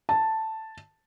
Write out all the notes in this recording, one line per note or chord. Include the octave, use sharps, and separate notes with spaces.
A5